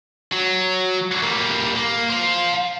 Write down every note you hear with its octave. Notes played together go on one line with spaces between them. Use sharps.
F#3
G3 A#3
A#3
C5 F5